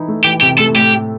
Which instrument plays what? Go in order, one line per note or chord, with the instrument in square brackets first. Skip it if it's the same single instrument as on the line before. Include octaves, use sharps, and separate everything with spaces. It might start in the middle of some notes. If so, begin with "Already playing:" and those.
Already playing: [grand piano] E3 D#4 E4
A3
[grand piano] E3 [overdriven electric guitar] G4
[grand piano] C3 [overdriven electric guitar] G4
[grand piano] A3 [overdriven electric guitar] A4
[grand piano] A2 [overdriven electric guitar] G4
[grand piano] A2